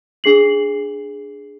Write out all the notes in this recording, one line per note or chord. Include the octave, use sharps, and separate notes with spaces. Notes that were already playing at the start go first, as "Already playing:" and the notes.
D4 G#4 C7 F#7